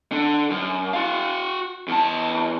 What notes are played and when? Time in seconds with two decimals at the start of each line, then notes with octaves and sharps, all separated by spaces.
0.12 D3
0.50 F#2
0.93 F#4 F5
1.88 E2 A5